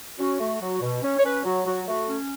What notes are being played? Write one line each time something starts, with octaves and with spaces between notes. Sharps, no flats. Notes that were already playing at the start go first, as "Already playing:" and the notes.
C#4 F#4
A3
F#3
B2
C#4
C#5
C#4 B4
F#3 F#4
F#3 F#4
A3 F#4
C#4